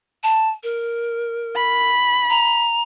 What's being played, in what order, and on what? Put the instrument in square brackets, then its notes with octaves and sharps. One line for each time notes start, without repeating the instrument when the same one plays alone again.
[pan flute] A5
A#4
[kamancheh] B5
[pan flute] A#5